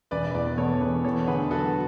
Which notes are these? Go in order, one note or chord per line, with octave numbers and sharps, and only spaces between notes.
E1 B4 D5
E2 B4 D5
B2 A4 C#5
E1 G#4 B4
E2 A4 C#5
D3 G#4 B4
F#3 F#4 A4